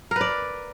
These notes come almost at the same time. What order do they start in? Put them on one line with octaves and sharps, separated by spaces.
A#4 B4 D5